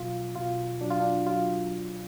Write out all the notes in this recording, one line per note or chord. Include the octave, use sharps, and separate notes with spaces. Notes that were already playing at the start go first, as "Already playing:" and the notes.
Already playing: B2 F#3 F4
B2 F4
F#3 D4
F4
D4
F#3 F4